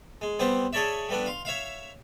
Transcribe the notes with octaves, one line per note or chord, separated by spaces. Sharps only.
G#3
G3 B3 C4 G4 C5
G#4 A4 C#5 D5 E5
G3 A3 B3 D4
F5 C6
C#5 E5 F5